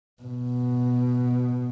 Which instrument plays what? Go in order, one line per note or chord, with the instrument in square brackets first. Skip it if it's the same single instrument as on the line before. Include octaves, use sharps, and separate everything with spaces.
[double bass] B2